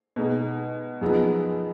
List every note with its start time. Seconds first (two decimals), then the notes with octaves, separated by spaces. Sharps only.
0.16 B2 G#3 D#4
1.01 F#2 F3 B3 D#4 G#4